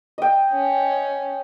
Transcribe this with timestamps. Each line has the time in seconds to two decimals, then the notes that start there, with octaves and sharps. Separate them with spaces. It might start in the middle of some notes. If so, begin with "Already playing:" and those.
0.18 D#5 G5
0.52 C#4